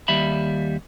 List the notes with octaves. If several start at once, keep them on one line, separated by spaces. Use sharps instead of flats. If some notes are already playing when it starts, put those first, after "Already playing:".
D#2 G3 E5 B5